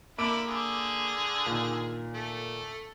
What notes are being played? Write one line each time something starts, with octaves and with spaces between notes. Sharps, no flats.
D3 A#3 E4 B5 D6 D7
D3 G#4
A#2 D#3
A3